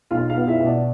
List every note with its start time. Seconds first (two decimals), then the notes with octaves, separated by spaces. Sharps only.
0.11 B1 F4 F5
0.29 F4 F5
0.35 B3
0.47 E4 E5
0.60 B2
0.66 D4 D5